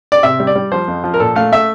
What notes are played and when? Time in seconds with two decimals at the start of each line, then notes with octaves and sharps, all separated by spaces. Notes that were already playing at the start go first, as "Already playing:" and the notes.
0.12 D5
0.23 C3 E5
0.40 G3
0.47 D5
0.55 G3
0.72 F3 C5
0.88 F2
1.04 F3
1.14 A#4
1.20 A#2 A4
1.35 A3 F5
1.52 A3 E5